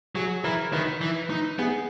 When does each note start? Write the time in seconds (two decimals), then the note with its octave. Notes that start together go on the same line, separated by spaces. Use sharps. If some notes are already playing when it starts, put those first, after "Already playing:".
0.15 F#3 G#4
0.44 E3 A#4
0.73 D#3 B4
1.01 E3
1.30 D#4
1.59 B3 G#4